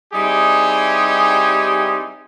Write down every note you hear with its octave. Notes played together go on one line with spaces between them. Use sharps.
G3 C4 D#4 E4 G4 G#4